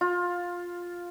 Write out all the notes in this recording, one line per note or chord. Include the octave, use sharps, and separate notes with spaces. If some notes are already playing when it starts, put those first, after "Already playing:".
F4